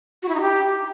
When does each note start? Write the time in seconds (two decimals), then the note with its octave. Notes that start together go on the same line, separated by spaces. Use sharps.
0.22 F#4
0.29 E4
0.35 D#4
0.41 G4